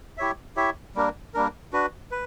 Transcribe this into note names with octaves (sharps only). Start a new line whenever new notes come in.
E4 G4 C#5 E5
E4 G4 C#5 E5
G3 A#3 D4 A#4
G3 A#3 D4 A#4
D4 F#4 B4
B4